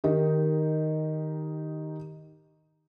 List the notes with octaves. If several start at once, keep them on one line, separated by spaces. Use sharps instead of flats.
D#3 D#4 G4